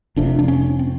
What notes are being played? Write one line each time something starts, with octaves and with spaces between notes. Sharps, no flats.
F1 F2 C3 D4
D4
C#4
C4